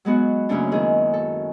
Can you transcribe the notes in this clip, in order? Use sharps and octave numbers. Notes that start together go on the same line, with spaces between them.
F#3 G#3 B3 F#4
F#2 C#3 A3 A#3 C#4 D4
D#3 E4 G#4
A4